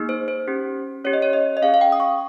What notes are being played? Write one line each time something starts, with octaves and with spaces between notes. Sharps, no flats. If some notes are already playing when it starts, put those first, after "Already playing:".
Already playing: A#3 D#4 G#4
C5
C5
C#4 G4
C#4 G4 C#5
D#5
C#5
D#5
D#5
C#4 G#4 F5
F5
G5
D#6
C#6